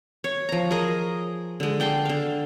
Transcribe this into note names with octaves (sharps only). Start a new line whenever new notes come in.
C#5
F3 A#5
G#4 A#4 D#5
D3 G#3
D5 G5 A5 C6
D3 F5